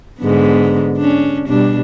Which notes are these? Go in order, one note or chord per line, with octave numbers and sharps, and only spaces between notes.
G#2 D3 B3
C#4 D4
B2 G3 D4